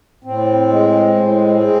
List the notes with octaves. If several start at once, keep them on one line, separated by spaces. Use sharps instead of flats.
A2 C4
G#3
A2
G#3